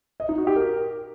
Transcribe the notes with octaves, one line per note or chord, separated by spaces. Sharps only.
D#5
D#4
F#4
G4
A#4